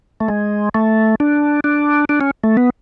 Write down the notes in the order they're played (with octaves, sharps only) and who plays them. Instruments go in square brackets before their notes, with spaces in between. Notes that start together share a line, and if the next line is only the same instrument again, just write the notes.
[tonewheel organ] A3
G#3
A3
D4
D4
D4
C#4
A3
B3